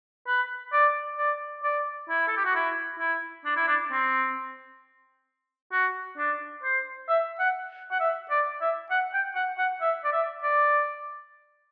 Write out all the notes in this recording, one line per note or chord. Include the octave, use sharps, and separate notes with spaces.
B4
D5
D5
D5
E4
A4
G4
F#4
E4
E4
D4
E4
D4
C4
F#4
D4
C5
E5
F#5
F#5
E5
D5
E5
F#5
G5
F#5
F#5
E5
D5
E5
D5